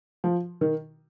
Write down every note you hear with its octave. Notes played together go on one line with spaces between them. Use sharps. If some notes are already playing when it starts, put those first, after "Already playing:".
F3
D#3